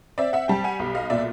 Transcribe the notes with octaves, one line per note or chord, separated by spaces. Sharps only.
C4 D5 E5
E5 F#5
G3 G5 A5
F#5 G#5
B1
D#5 F5
A#2 D5 E5